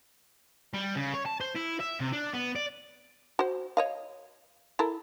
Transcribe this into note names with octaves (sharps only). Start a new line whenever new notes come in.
G3
C#3
C#5
A5
C5
E4
E5
C3
D4
B3
D5
F#4 C5
C#5 D#5 F5
E4 A4 A#4